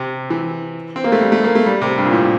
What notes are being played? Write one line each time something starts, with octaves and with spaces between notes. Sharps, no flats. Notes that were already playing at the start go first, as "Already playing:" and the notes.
Already playing: C3
E3
C4
A#3
A3
G3
A3
A#3
A3
G3
C3
G2
A#2
A2